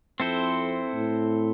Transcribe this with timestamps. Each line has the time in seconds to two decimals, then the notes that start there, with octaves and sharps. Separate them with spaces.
0.19 F2 C4 E4 A4 C5
0.93 A2